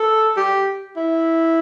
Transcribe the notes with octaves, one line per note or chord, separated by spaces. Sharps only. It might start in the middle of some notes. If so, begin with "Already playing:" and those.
Already playing: A4
G4
E4